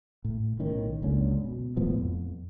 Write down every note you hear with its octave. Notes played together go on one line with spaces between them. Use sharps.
A2
B1 A2 D#3 C#4
F#1 C#2 D3 C#4
B2
E1 A2 F3 B3
F2